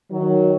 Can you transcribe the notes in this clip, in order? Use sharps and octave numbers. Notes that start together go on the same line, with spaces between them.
D#3 F#3